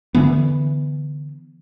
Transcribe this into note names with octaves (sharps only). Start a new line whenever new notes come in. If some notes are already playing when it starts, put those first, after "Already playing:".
D3 E3 B3